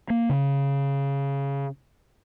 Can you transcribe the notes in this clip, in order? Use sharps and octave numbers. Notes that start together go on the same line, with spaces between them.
A#3
C#3